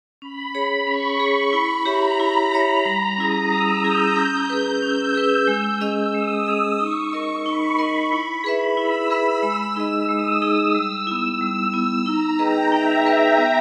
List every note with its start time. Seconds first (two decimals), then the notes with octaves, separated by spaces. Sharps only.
0.21 C#4 B5
0.55 G#4 C#5
0.87 C#4 C#6
1.20 G#4 C#5
1.53 E4 B5
1.86 G4 C#5 E5 A#5
2.18 E4 A#5
2.52 G4 C#5 E5
2.85 G3 A#5
3.17 C#4 E4 G#4 D#6
3.50 G3 E6
3.83 C#4 E4 G#4 G6
4.16 C#4 G6
4.50 G#4 B4
4.82 C#4 E6
5.15 G#4 B4
5.48 G#3 E6
5.81 C#4 G#4 D#5
6.14 G#3 D#6
6.46 C#4 G#4 D#5
6.80 D#4 C#6
7.13 A#4 D#5
7.45 D#4 B5
7.79 A#4 D#5
8.12 E4
8.44 G#4 B4 E5
8.77 E4 E6
9.10 G#4 B4 E5
9.42 G#3
9.76 D#4 G#4 D#5
10.09 G#3 D#6
10.41 D#4 G#4 D#5
10.75 G3 E6
11.07 B3 E4
11.41 G3 E6
11.74 B3 E4
12.06 D#4 A#5
12.39 G#4 B4 D#5 G5
12.72 D#4 E5
13.05 G#4 B4 D#5
13.38 B3